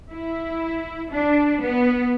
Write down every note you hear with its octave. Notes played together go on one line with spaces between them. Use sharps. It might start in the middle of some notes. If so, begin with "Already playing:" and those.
E4
D4
B3